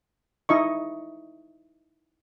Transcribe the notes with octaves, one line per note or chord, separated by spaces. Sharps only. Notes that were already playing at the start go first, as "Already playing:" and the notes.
D#4 E4 D#5 C#6